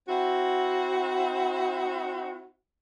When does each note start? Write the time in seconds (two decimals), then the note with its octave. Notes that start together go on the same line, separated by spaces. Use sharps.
0.09 C4 E4 F#4